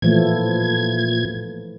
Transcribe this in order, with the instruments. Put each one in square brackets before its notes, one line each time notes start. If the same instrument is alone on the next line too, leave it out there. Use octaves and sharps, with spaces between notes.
[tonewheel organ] A#2 G#6 [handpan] E3 F3 A3